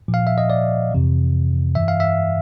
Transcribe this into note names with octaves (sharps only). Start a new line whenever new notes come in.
A#2 F3
F5
E5
D#5
D5
F2 C3 E3
G2 E3 E5
F5
E5